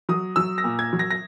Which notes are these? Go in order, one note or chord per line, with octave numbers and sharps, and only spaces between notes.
F#3 D#6
F#3 E6
A#6
A#2
G#6
F#3
A#6
A#6